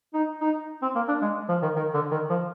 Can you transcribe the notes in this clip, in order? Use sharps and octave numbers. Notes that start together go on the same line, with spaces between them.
D#4
D#4
C4
A#3
D4
G#3
F3
D#3
D#3
D3
D#3
F3